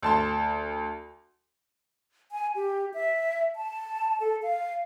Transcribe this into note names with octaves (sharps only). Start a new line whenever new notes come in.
D2 A5 C6
G#5
G4
E5
A5
A4
F5